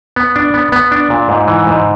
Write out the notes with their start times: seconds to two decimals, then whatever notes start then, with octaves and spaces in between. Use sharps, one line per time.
0.16 B3
0.36 D4
0.54 B3
0.72 B3
0.92 D4
1.10 A#2
1.29 G#2
1.48 E3
1.67 G#2